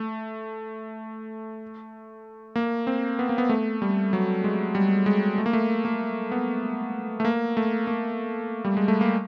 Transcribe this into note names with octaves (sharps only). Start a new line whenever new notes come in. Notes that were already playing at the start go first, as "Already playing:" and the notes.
Already playing: A3
A#3
C4
B3
A#3
B3
A3
G3
F#3
G#3
G3
G#3
A3
A#3
A3
A#3
B3
A3
A#3
A3
A#3
G3
G#3
A3
A#3